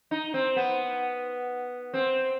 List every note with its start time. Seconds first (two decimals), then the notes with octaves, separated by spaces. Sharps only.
0.11 D#4
0.34 C4
0.56 B3
1.94 C4